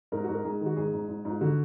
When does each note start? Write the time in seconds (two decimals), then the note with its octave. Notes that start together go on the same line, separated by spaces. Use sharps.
0.12 G#2 A#4
0.24 F#4
0.28 G#2
0.34 A#4
0.44 G#2 G#4
0.61 D#3 F#4
0.76 G#2 G#4
0.94 G#2
1.09 G#2
1.25 G#2
1.31 F4
1.41 D3 F#4